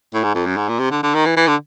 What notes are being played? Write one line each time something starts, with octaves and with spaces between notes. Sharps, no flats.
A2
G#2
F2
F#2
G#2
A#2
C3
D3
D3
D#3
E3
E3
D3